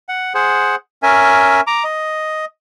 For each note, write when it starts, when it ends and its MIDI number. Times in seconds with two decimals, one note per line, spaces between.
0.09 0.34 78
0.35 0.76 68
0.35 0.76 72
0.35 0.76 78
1.03 1.61 61
1.03 1.61 70
1.03 1.61 76
1.03 1.61 80
1.67 1.84 82
1.67 1.84 86
1.84 2.45 75